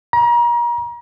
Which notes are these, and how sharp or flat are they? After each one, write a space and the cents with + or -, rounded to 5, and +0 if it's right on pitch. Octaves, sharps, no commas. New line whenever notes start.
A#5 +35